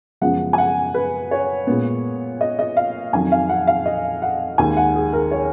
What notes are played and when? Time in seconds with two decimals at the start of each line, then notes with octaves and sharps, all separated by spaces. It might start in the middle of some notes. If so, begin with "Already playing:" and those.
0.21 F#2 C#3 F3 G#3 B3 F#5
0.53 G#5
0.58 F#5
0.94 B4
1.31 C#5
1.67 A#2 G#3 B3
2.41 D#5
2.59 D#5
2.77 F5
3.13 F2 D#3 F#3 G#5
3.32 F5
3.49 F#5
3.67 F5
3.86 D#5
4.22 F#5
4.58 D#2 D#3 G#3 G#5
4.77 F#5
4.95 G#4
5.13 A#4
5.31 C#5